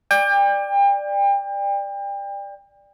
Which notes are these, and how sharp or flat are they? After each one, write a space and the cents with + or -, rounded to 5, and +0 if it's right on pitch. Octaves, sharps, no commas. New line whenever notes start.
D5 +10 G5 +35